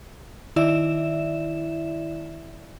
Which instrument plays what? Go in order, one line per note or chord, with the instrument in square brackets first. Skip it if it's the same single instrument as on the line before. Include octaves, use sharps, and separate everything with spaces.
[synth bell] D#3 E4 D5 E5 E7